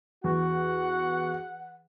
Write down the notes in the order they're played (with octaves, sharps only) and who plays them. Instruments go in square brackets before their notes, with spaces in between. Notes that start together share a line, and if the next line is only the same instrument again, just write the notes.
[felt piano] E2 [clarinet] F#4 [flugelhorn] F#5